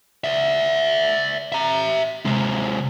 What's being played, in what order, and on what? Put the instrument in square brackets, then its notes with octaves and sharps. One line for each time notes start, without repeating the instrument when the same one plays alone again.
[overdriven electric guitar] D5 E5
E5 A#5
C3 G#3